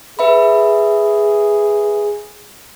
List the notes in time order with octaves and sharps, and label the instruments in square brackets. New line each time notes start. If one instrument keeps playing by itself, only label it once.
[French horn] G#4 [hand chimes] B4 E5 B5